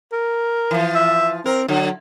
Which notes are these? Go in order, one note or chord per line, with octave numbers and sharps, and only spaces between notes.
A#4
E3 F3
E5
C4 A#4
D3 F#3